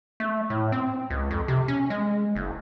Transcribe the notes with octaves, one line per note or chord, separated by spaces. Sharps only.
A3
A2
C4
C#2
F2
C3
C#4
G#3
F#1